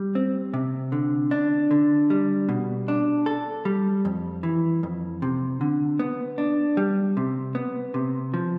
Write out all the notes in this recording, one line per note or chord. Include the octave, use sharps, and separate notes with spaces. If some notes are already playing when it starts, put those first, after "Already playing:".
Already playing: G3
C4
C3
D3
D4
D3
G3
B2
D4
A4
G3
F2
E3
F2
C3
D3
B3
D4
G3
C3
B3
C3
F3